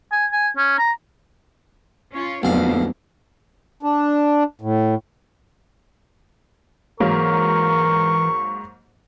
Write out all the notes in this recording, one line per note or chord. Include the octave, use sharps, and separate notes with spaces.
G#5
G#5
C#4
A#5
C#4 F4 C#5
D1 B1 F2 A#3 D4 F5
D4
A2
G#2 E3 F#3 A#3 A#4 C#6